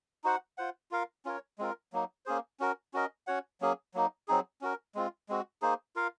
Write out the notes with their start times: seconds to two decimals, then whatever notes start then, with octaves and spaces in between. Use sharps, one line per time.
0.24 D#4 F#4 C5 F#5
0.58 F4 C5 F#5
0.91 F4 A#4 F5
1.25 C#4 F4 A#4 C#5
1.58 G#3 C4 F4 A#4
1.93 F#3 A#3 D#4
2.26 A#3 C#4 G#4 C5
2.60 C#4 F#4 A#4
2.94 C#4 F#4 A#4 D#5
3.27 C#4 F#4 C#5 F#5
3.61 F#3 A#3 C#4 G#4
3.94 F#3 A#3 D#4
4.28 F#3 C4 D#4 G#4
4.61 C#4 F#4 A#4
4.95 G#3 C4 F4
5.29 G#3 C4 F#4
5.62 A#3 D#4 G#4 C5
5.96 F4 A#4 F5